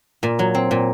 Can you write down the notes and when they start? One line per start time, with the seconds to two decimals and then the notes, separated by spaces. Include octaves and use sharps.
0.23 A#2
0.39 F#3
0.55 C4
0.71 A#2